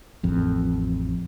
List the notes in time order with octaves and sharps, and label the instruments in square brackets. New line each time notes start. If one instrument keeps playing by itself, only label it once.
[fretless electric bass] A1 F2